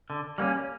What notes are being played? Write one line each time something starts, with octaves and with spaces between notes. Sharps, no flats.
D3
G3 A#3 C#4